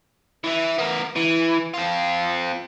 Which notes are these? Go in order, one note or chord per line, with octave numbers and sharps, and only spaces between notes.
E3 E4
B3 A#4
E3
C4 F4